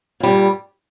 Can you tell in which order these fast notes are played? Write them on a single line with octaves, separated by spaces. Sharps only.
A#2 G3 G2